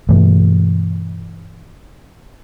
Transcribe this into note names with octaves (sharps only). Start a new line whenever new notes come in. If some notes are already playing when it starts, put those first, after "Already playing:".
G2 B2 E3 A3